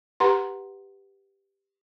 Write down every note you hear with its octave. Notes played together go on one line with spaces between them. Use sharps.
G4 B4 F#5 A#5 C6